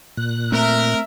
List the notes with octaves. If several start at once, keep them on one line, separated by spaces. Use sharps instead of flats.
A#2 F#6
A3 C4 A#4 E5